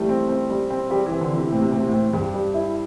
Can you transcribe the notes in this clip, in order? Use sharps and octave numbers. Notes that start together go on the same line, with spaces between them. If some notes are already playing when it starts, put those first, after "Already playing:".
Already playing: E3 G3 A3
C4
C4
G3
C4
G3 G4
E3
C4
D3
C3 E3
A2 C4
C3
A2 C4
C3
A2
C4
G2 G4
G3
E4